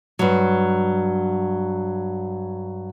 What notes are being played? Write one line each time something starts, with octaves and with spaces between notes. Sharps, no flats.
G2 F#3